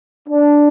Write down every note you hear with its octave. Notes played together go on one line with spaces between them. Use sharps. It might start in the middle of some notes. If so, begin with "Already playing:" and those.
D4